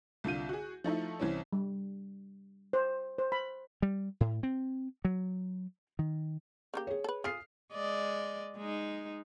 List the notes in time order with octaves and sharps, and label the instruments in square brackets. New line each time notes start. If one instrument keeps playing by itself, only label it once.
[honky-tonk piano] C2 D3 F4 G6 D#7
F#4 G#4
F3 A3 D#4 E4
C2 E3 C4 C#4
[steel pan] G3
C5
C5
B5
[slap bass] G3
A2
C4
F#3
D#3
[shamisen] C#3 A#3 G4
[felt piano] G#4 C#5
[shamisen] A4 B4
[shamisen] F4 G#4 [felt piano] D#6 F6 C7
[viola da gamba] G#3 D5 D#5
G#3 D#4